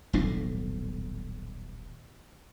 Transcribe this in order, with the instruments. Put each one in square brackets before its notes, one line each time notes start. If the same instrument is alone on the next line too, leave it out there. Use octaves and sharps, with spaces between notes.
[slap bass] D#1 B1 A2 D4